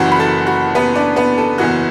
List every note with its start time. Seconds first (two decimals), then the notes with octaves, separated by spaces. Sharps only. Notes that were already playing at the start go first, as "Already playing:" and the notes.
Already playing: F#1 F#2 E3 F#4 F#5
0.12 B5
0.19 A4 A5
0.47 F#4
0.75 B3 B4
0.95 D4 D5
1.16 B3 B4
1.38 A4
1.58 F#1 E2 E3 F#4